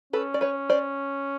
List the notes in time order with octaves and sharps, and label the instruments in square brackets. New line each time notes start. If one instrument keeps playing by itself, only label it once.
[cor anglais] C#4 [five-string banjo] A4 B4
[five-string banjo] D5
B4 C#5
C5 D5